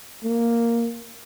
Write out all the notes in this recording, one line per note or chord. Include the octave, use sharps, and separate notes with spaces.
A#3